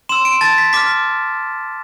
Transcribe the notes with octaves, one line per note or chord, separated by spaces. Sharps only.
C6 E6 E7
D7
A5 A6
B6
D6 F6 B6